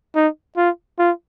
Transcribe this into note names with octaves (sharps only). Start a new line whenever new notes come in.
D#4
F4
F4